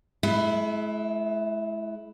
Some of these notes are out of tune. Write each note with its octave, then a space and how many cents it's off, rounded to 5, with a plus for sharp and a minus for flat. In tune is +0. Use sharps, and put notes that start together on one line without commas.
G#3 +45 E4 +0 E5 +0